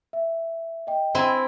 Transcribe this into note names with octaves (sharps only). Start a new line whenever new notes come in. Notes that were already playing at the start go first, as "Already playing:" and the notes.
E5
D#5 G5
C4 E4 G#5